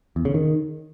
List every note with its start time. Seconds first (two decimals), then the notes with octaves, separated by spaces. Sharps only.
0.16 E2
0.25 C#3
0.34 D#3